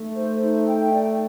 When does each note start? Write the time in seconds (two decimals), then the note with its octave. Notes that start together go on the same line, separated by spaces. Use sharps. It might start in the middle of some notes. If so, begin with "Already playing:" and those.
Already playing: A3 D#4
0.13 C5
0.40 D#4
0.66 G5
0.92 D5